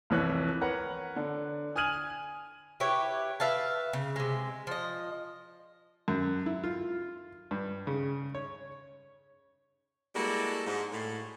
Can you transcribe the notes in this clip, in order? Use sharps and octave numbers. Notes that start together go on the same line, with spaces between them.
C2 F2 E3 C#5 F#6
A#4 B4 C#5 F#5 A#5
D3
G#5 D#6 F6 G#6 D#7 F#7
E4 G4 B4 C#5
B4 E5 F5 A5
C#3
C3 G#3
F3 D#5
F#2
E4
F4
G2
C#3
C#5
G3 G#3 A#3 E4 F#4 A4
G#2
A2